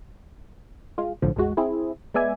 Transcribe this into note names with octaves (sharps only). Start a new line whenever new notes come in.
G#3 F4
B1 A2 D3 F3
A1 E2 G#3 F#4
C4 E4 G#4
G#3 B3 D5 E5 G#5